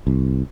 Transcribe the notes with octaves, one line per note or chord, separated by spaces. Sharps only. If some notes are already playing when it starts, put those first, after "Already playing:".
C2